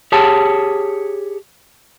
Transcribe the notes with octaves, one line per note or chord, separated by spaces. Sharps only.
G4 G#4 C#5 A5